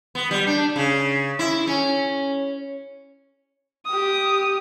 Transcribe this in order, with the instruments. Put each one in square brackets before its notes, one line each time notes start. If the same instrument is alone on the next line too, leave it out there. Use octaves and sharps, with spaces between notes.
[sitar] B3
G3
D4
C#3
E4
C#4
[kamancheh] G4 D#6